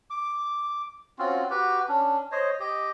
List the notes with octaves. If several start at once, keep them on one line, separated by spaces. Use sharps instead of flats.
D6
C4 C#4 F4 F#4
F#4 G4 B4
C#4 D4
C5 C#5 D#5
G4 D#5